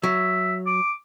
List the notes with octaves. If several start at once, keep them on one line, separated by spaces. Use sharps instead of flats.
F#3 E5
D6